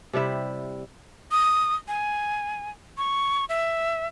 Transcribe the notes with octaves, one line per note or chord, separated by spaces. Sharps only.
C3 G3 E4 E5
D#6
G#5
C#6
E5